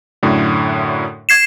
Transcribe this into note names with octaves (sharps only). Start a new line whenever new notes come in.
F#2 A2 D3
G#6 C7 E7